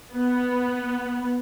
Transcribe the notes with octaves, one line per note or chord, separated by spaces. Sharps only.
B3